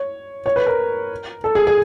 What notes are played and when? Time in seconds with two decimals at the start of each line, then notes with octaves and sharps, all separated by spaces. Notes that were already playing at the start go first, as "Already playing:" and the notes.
Already playing: C#5
0.46 C#5
0.56 B4
0.67 A#4
1.44 A4
1.55 G#4
1.67 G#4